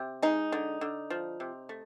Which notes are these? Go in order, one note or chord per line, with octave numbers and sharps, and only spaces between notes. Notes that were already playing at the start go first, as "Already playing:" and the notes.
Already playing: C3
G#3 D#4
D3
D3
F3
C3
A3